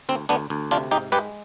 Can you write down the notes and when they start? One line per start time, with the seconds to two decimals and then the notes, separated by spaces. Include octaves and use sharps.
0.09 D2 C4
0.29 D2 B3 D4
0.50 D2
0.71 C3 D4 F4
0.91 G#2 D#4 G4
1.12 G#3 G4 B4